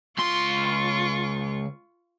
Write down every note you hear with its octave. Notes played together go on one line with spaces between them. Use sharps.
C#2 F4 C6 C#6